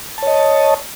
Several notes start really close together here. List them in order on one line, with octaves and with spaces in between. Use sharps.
A5 C#5 D#5